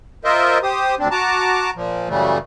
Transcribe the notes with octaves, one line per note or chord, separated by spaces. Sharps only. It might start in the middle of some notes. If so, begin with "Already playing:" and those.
F4 A#4 C5 D#5 E5
G4 C5 D#6
D2 C4 D4
F#4 A5 A#5 D6
A#2 F3
F#2 C#3 E3 G3 A3